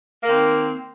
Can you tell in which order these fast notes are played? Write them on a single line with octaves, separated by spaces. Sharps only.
A#3 D#3 C4